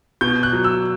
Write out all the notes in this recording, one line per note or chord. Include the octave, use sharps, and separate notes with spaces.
B2 G6
F#6
F#3
E6